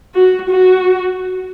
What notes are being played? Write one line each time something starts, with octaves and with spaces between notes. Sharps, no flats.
F#4
F#4